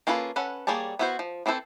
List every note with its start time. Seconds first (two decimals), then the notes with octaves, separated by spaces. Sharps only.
0.07 A#3 C#4 F4 A4 B4
0.36 C#4 A4 B4 F#5
0.67 G3 A#3 G#4 C#5 A5
0.99 B3 E4 F#4 A#4 C5
1.19 F3
1.46 E3 C4 E4 A4 C5